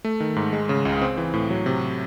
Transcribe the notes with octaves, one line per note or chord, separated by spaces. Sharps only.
A3
D#3
G#2
G#3
C#3
C#2
C4
E3
A2
F#3
C3